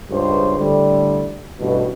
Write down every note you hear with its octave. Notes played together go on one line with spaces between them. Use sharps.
C#2 G2 C#4 C5
A2 D3 G3
A1 G2 B2